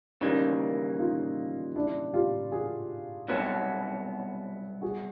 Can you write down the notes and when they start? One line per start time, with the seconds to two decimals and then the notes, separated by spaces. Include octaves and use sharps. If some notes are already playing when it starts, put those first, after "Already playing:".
0.21 D#2 C#3 E3 G3 A#3 C#4 D#4
0.99 D#4 F4
1.75 D4 E4
2.14 F4 G4
2.52 F#4 G#4
3.28 C2 B2 F#3 B3
4.82 F#4 G#4